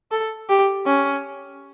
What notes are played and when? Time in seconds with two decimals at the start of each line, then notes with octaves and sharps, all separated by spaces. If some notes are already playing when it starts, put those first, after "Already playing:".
0.12 A4
0.50 G4
0.87 C#4